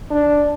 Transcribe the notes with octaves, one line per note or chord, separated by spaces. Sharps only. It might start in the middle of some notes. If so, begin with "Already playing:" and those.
D4